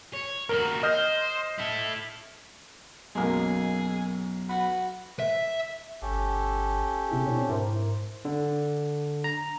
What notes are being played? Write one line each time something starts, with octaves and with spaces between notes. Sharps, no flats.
C#5
D#2 F#4 A#4
C5 D#5 F6 G6
E4 A4
B1 F#2 G#3 A#3 G#4
F#4 B4
E5
G1 C#4 G4 A4
C3 E4 G#4
B2 C4 D4 C#5
G#2 E4 A#4 C5
D3
A#5